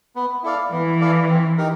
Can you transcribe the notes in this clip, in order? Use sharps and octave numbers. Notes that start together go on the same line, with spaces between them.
B3
E4 A4 D5 F5
E3 B3
E4 A4 D5 F5
C4
D#4 G4 A#4